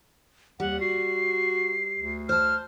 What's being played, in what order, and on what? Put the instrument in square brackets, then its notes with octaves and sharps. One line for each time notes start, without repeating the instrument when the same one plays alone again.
[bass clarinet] D#2 [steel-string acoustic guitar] G3 [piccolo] F#5
[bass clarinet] F#4 [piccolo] C7
[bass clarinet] D2
[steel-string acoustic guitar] C5 A5 [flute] F6